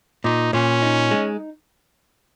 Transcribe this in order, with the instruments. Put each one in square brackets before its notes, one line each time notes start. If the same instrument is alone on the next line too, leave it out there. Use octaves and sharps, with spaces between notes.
[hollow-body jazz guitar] A#2 [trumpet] D#4
[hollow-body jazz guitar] A#2 [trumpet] C#4
[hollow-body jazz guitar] D#4
G#3